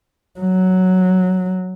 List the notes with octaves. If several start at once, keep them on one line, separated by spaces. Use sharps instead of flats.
F#3